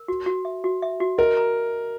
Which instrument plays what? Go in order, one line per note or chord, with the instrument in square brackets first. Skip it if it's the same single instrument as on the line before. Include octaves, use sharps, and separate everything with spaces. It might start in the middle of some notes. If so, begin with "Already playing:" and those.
Already playing: [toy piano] A#4
F#4
F#4
E5
F#4
E5
F#4
[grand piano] A#4 [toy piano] D#5
[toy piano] A#5